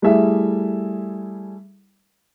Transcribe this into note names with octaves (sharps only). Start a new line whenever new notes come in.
G3 A3 E4 G#4 E5